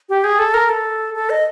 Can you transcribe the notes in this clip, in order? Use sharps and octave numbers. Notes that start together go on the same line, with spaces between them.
G4
G#4
A4
A#4
A4
A4
D#5